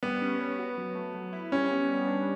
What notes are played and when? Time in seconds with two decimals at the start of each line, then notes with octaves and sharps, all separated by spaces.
0.03 G3 B3
0.22 C#4
0.40 B4
0.59 F#4
0.78 F#3
0.95 A3
1.14 F#3
1.33 E4
1.52 G3 C#4
1.71 B3
1.89 G3
2.07 D4